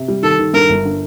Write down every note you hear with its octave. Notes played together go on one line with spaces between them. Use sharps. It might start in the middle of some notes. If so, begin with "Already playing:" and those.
Already playing: C3
G3
D#3 A4
D#3
G2 A#4
G1
D3